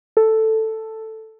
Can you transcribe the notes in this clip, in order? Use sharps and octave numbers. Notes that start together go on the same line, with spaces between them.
A4